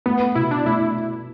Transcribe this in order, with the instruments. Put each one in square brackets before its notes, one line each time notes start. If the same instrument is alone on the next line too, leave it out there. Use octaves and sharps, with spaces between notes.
[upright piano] A3 [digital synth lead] B3
[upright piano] B2 [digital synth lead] E4
[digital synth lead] D4
[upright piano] A3 [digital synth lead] E4